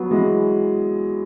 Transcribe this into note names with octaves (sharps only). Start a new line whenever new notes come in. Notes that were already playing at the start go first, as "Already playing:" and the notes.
Already playing: F#3 B3
E3 G#3